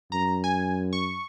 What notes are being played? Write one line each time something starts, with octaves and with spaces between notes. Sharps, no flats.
F#2 A#5
G#5
C#6